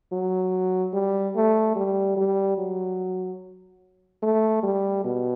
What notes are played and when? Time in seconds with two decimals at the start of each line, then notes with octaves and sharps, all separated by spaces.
0.12 F#3
0.93 G3
1.36 A3
1.76 G3
2.17 G3
2.58 F#3
4.22 A3
4.63 G3
5.05 B2